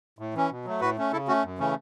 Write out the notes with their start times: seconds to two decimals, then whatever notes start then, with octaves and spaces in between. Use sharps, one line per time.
0.19 A2
0.34 E3 C#4
0.50 B2
0.65 F#3 A3
0.81 A2 F#4 B4
0.97 A3 C#4
1.12 C#3 E4 A4
1.28 A3 C#4 F#4
1.44 F#2
1.59 C#3 E3 A3 C#4